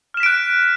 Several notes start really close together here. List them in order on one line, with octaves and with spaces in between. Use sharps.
F6 E7 B6 D7 F#6